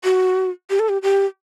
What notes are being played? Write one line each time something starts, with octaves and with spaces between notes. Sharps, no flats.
F#4
G4
A4
G4
G4